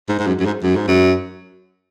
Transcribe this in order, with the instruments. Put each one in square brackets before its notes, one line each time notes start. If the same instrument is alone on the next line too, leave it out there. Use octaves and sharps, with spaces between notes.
[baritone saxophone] G#2
G#2
F#2
F#2
G#2
F#2
G#2
F#2